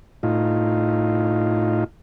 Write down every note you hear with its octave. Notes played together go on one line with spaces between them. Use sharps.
A2 D#4 F4